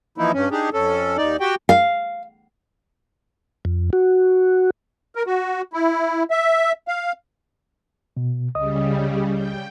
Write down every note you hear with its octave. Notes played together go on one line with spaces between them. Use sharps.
E3 F3 A#3 D#4 E4
G2 C#4
D4 D#4 G4 G#4
F2 C#4 A4
D#2 D#4 D5
F#4 G4 G5
F5
F2
F#4
A#4
F#4
E4
E5
F5
B2
C#2 C#3 G3 D#5 D#6
G5